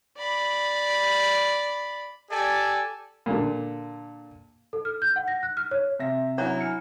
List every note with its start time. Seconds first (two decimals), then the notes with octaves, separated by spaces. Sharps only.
0.17 D5 B5
2.30 G4 A4 D5 G#5
3.26 A#2 D3
4.73 A4
4.85 F6
5.02 G6
5.16 F#5
5.28 A#6
5.43 F#6
5.57 F6
5.71 C#5
5.99 C3 E5 A#6
6.38 F#3 D4 E4 C#5 A#5
6.60 G#5 F6 C#7